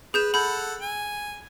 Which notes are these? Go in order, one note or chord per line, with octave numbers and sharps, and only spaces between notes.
G#4 B4 G6 E7
A4 F#5 B5 G6
G#5